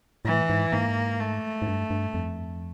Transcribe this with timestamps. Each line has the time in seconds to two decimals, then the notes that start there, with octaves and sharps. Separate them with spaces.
0.25 A2 E3
0.49 G#2
0.72 G#2 A#3
1.20 A3
1.62 G#2
1.67 G2
1.90 G2
2.14 F2